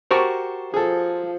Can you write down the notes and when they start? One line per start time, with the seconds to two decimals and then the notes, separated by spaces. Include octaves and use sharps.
0.11 F#4 G4 A#4 C5 A5 C#6
0.74 F3 G#4 A4